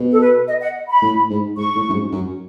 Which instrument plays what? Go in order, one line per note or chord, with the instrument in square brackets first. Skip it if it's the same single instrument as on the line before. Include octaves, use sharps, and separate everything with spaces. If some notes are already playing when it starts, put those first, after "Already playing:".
Already playing: [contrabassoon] B2
[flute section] A4
B4
D#5
F#5
B5
[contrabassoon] A2
G#2
[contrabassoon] G#2 [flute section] C#6
[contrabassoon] A2
F#2
G#2
F#2